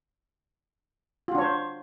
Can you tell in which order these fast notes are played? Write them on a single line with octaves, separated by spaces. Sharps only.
F4 F#4 D4 C#5 C5